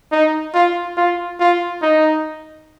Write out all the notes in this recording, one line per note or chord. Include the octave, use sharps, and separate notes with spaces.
D#4
F4
F4
F4
D#4